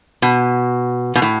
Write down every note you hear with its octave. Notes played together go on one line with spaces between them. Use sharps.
B2
B2
A2